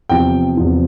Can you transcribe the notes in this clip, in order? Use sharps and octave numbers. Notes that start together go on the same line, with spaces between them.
E2 C3 F3 G5
E2 C3 F3